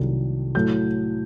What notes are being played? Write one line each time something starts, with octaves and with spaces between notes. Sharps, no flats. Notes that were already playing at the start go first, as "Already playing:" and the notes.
Already playing: C2 C3 D#3 F#3 A3
A2 F#3 A3 G6